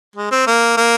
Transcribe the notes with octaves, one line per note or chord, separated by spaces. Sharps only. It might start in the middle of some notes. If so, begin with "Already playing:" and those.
G#3
C4
A#3
A#3